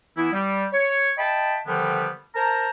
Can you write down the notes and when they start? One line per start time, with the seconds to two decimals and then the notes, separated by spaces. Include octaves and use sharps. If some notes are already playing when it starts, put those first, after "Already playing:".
0.16 E3 B3 E4
0.32 G3
0.72 C#5
1.18 D#5 E5 G5 A5 B5
1.67 D3 D#3 F3 G3 B3
2.35 A#4 C5 A5 A#5